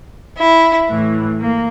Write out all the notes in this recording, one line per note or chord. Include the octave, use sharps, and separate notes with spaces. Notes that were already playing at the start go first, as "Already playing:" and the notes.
E4
A2 E3
A#3